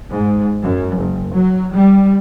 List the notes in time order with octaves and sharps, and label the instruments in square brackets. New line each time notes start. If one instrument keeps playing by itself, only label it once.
[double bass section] G#2
F#2
F#1
F#3
G3